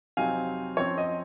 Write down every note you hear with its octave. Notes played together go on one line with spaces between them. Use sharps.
F2 C3 F#3 C4 D#4 F5 G#5
F#2 F3 C4 C#5
D#5